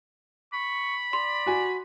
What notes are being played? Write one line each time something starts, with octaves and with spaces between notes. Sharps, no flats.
B5 C#6
D5 C6
F#4 G#5